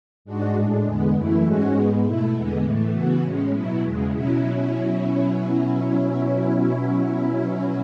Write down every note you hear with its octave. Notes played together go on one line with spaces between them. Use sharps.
G#2 G#3 D4 F#4
A2 G#3 D4
E2 D3 G#3 B3
F#2 E3 A3 E4
G#2 G#3 C#4 F#4
G#2 G#3 B3
B2 A3 E4
E2 D3 G#3 B3
A2 E3 A3
C#3 E3 B3 F#4
A2 G#3 C#4
B2 F#3 B3 E4
E2 C#3 G#3
B2 F#3 C#4 E4